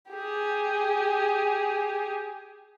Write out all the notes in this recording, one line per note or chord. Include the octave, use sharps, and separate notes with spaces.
G4 G#4